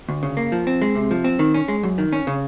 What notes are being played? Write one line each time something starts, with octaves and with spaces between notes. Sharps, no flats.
D2
C#3
A#3
F3
C4
G#3
C3
F3
C4
D#3
C#4
G#3
F#2
D#3
C#4
C#3